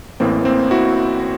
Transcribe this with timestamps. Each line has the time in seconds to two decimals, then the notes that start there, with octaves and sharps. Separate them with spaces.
0.20 A1 A2 E3 A#3 C4
0.45 A#3 C4
0.71 E4 F#4